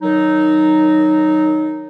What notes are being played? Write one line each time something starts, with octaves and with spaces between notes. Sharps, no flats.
D#3 F#3 D#4